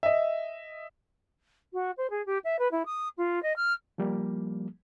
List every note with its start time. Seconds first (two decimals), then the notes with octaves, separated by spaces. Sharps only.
0.03 D#5 E5
1.73 F#4
1.97 C5
2.10 G#4
2.26 G4
2.44 E5
2.58 B4
2.71 E4
2.85 D#6
3.17 F4
3.42 D#5
3.56 F6
3.98 F3 G3 A#3